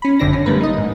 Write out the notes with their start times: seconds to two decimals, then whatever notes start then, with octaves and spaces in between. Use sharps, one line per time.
0.02 C#4 B5
0.19 G#1 F#2 D3 C4 D4 A#6
0.33 C#4
0.46 D3 G3 A3 A#3 A#4 B4
0.61 D#4 D#5
0.78 G#2